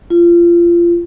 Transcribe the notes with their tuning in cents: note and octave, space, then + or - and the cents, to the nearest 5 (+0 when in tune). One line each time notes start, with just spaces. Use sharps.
F4 -25